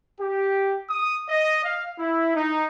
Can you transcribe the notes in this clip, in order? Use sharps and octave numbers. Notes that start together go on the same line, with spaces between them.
G4
D#6
D#5
F5
E4
D#4